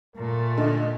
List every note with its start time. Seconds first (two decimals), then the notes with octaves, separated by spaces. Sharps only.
0.16 A#2 A3 A#4
0.57 D3 D#5